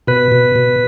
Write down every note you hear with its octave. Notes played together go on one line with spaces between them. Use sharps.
B2 B4
B2
B2